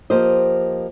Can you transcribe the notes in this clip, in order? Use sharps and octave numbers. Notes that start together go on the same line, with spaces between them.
F3 A#3 G4 C5 D#5